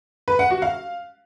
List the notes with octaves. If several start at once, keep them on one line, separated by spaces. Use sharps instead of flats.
B4
F#5
F#4
F5